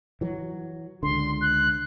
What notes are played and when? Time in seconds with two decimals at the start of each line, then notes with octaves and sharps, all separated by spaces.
0.21 E3 F#3
1.03 C#2 D3 C6
1.41 F#6